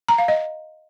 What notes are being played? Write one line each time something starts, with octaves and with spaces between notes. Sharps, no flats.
A#5
F5
D#5